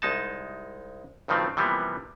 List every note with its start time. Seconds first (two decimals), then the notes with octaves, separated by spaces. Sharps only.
0.02 C2 G#3 D#4 A5
1.28 B1 G2 D#3 F3 A3 C4
1.57 C3 E3 F3 G3 A#3 B3